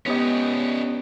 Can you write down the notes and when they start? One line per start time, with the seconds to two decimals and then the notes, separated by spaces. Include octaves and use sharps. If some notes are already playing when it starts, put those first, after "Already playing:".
0.06 B3 C#4 D#4 G4 D#5